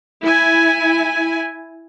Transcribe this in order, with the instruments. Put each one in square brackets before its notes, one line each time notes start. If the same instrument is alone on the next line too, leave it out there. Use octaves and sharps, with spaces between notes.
[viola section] E4 G#5